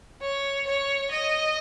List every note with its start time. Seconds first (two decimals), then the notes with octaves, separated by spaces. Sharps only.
0.22 C#5
0.67 C#5
1.11 D#5